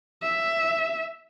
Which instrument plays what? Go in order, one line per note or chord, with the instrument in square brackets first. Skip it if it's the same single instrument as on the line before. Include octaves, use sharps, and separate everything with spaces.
[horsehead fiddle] E5